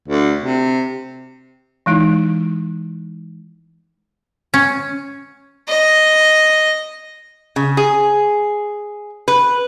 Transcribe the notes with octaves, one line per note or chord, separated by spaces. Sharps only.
D2
C3
E3 G#3 D#4 E4
C#4
D#5
C#3
G#4
B4